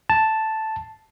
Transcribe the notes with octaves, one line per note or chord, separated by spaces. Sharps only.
A5